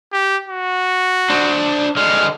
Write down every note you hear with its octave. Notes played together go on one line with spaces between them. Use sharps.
G4
F#4
D4 C5
D3 G#3 F6